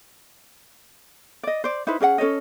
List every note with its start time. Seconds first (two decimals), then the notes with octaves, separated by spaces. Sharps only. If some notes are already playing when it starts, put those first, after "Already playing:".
1.43 D5 D#5
1.64 C5 D5
1.87 D#4 E4 B4 C5
2.00 C#4 G#4 D5 F#5
2.18 C#4 A4 C#5 D#5